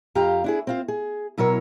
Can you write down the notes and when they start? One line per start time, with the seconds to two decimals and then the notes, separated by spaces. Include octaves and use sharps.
0.15 F2 F4 G4 F5 A#5
0.44 D4 E4 G#4
0.67 C4 F4 C5
0.88 G#4
1.38 B2 F#3 E4 A#4 C#5